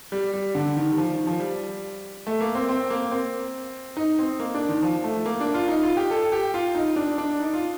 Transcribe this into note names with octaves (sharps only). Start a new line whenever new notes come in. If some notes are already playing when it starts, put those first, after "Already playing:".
G3
G3
D3
D#3
G3
F3
D#3
F3
G3
A3
A#3
C4
C4
A#3
C4
D#4
C4
A#3
D4
D#3
F3
A3
A#3
D4
F4
D#4
F4
G4
A4
G4
F4
D#4
D4
D4
D#4
F4